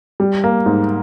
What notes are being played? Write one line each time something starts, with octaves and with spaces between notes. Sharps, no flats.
G3
A#3
G#2